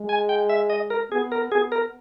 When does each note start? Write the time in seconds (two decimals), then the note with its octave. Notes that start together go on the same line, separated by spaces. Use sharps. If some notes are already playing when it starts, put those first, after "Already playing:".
Already playing: G#3
0.09 G#5
0.29 G5
0.49 E5
0.70 D#5
0.90 A#4
1.12 B3 G#4
1.32 A#4
1.52 B3 G#4
1.72 A#4